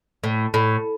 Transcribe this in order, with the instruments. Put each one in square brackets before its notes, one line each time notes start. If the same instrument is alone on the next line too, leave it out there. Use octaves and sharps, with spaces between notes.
[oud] A2
A2